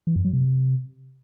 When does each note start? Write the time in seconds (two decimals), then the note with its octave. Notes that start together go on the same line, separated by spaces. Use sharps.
0.07 E3
0.16 F#2
0.25 F#3
0.33 C3